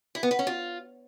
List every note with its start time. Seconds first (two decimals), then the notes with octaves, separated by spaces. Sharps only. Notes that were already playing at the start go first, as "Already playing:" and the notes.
0.15 E4
0.23 B3
0.31 B4
0.39 C#4
0.47 F4